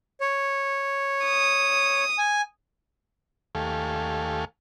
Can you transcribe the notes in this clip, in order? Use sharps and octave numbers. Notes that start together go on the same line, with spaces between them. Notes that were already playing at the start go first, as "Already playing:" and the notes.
C#5
D#6
G#5
D#2 A3 G4 A4 F5 G#5